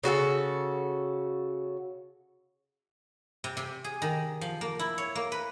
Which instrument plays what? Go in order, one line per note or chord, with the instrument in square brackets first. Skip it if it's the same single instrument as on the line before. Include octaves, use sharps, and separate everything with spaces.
[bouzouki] C#3 F#4 G4 A4
[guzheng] C3
C3
G#4
D#3
F3
A#3
E4
C#5
A#3
B4